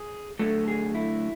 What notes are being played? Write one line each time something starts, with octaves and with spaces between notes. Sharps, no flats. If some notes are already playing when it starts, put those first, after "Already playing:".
Already playing: G#4
D3 F#3 A3 A4
G#4
E4